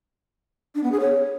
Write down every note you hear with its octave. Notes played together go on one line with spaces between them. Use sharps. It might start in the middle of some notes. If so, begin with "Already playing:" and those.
D4
B3
G#4
C#5